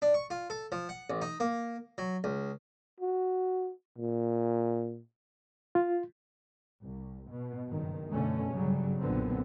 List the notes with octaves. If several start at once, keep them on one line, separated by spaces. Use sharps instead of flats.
D4
C#6
F4
A4
F3
F#5
A1
D#4
A#3
F#3
C#2
F#4
A#2
F4
C2
B2
F#1 G2 D#3
F#2 B2 D3 A3 C#4
G1 C#3 F#3 G3
B1 F#2 A#2 D3 B3 C4